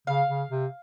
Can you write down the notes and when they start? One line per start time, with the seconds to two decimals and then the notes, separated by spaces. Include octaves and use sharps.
0.07 C#3 F5
0.28 C#3
0.51 C3